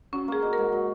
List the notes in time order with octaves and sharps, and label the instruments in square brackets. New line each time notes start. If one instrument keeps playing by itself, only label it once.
[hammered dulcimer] F#3 [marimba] C#4
[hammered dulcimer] A#3 [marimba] G#4
[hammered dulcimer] D#4
[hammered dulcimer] G#2 [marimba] A#4
[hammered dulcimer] F#3